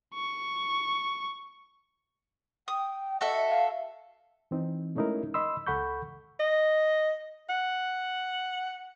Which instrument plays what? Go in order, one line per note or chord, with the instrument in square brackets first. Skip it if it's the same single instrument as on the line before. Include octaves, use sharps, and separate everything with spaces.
[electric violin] C#6
[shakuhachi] G5 [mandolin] D#6
[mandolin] F#4 A4 E5 [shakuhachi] D#5
[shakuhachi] F5
[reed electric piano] E3 C4 D#4
G#3 A3 C#4 D#4 E4 A#4
D#5 B5 C6 E6
C#2 A4 F#5 B5 C#6 G6
[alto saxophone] D#5
F#5